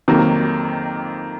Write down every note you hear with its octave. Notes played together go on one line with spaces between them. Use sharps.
F2 C3 D#3 F#3 A#3